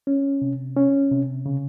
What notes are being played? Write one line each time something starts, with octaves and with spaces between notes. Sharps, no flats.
C#4
C3
C#4
C3
C#3